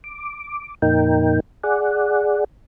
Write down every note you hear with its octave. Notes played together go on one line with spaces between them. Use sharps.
D6
F2 A#2 D#4 A#4 G5
G#4 D5 F#5